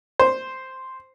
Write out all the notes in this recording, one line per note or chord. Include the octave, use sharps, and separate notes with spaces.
C5